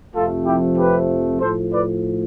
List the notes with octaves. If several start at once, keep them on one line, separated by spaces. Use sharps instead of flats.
F2 C3 F3 A3 F4 A4
E4 G4
G4 B4
A2 F3 A3 A4 C5
B4 D5